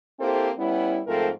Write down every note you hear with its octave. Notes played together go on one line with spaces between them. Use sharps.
A#3 C4 E4 G4 A4 C5
G3 B3 C#4 E4
G#2 F3 A3 C4 A4 A#4